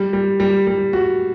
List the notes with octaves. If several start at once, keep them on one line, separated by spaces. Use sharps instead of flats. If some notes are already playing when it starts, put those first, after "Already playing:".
Already playing: G3
G3
G3
G3
F#4